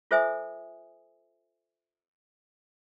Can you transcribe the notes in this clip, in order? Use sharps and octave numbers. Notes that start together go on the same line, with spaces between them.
F4 A4 C5 E5 G#5 D#6